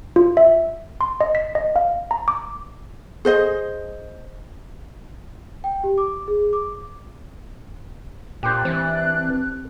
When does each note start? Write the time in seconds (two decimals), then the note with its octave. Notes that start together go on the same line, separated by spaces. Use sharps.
0.16 F4
0.37 E5
1.01 C6
1.21 D#5
1.35 B6
1.55 D#5
1.76 F5
2.11 A#5
2.28 D6
3.25 G#4 C5 D#5
5.64 G5
5.84 G4
5.98 D6
6.28 G#4
6.53 D6
8.43 A#2 D4 G4 C5 F#6
8.65 E3 C4